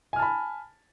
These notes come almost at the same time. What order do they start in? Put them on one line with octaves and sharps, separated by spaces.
G#5 F6 A5 B5